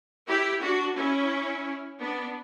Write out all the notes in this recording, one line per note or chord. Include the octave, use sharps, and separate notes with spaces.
E4 G4
D4 F#4
C#4 E4
B3 D4